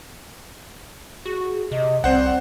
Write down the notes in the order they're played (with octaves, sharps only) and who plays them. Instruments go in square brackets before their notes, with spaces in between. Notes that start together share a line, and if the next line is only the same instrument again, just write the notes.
[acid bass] F#4 [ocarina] G#4
[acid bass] C3 [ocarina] D#5
[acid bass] C2 [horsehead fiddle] C4 [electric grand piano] C5 F#5 [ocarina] D5